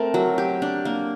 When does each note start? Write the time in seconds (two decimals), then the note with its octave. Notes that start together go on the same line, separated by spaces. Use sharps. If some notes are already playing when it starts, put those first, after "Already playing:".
Already playing: A3 C4 A#4
0.14 F#3
0.38 G4
0.62 D4
0.85 A#3